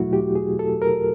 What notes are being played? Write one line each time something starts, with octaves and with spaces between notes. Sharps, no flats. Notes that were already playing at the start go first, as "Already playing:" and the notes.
Already playing: E2 B2 F#3 A3 E4 F#4
G4
G#4
A4
A#4